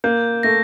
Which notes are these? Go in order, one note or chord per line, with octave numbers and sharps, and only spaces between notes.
A#3 G6
A3 A#6